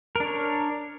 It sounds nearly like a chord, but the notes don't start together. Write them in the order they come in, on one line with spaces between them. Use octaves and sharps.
A#4 D4 C#5